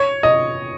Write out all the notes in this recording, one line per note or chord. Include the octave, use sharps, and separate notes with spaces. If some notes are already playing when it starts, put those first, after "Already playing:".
Already playing: C#5
D#5